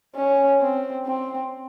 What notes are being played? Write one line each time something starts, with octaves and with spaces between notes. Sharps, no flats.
C#4
C4
C4